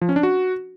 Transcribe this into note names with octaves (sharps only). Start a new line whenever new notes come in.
F3
C#4
D4
F#4